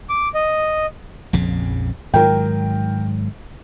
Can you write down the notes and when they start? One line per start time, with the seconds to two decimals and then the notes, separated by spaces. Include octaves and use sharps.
0.09 D6
0.35 D#5
1.33 A#1 F2 C#3
2.14 G#2 D#3 F#3 A#4 G5